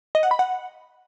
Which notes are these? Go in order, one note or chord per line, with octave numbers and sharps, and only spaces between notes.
D#5
F#5
B5
F#5